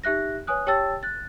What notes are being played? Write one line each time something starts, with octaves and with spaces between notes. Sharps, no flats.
D#4 G4 E5 F#6 A#6
B4 C#5 G#5 D#6 F#6
G4 C#5 G5 A5 E6 A6
F#6 A6